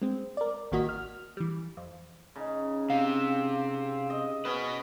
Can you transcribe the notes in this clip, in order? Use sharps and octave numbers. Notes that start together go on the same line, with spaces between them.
G#3 C4
A#4 D5
A1 D#3 A#3 F#4 D#5 B6
F6
E3 G3
F2
C#3 D#4
C3 F5
D#5
B3 C#4 B4 D#5